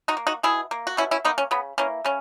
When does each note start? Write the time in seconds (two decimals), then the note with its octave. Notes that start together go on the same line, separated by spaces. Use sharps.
0.08 D#4 F#4
0.17 A#3
0.27 D#4 F#4
0.43 B2 E4 G#4
0.71 A#3
0.87 F#4
0.97 B2 C#4 E4
1.11 C#4 E4
1.25 A#3 B3 D#4
1.38 C#4
1.51 C#3 B3
1.78 E3 A#3 C#4
2.04 C#3 C#4